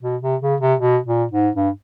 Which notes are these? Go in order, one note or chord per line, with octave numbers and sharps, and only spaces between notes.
B2
C3
C#3
C3
B2
A#2
G#2
G2